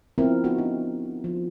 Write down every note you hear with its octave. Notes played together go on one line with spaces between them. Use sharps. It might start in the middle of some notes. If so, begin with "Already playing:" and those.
F3 B3 C4 E4 A#4
B3 D4 F#4
D#4
F3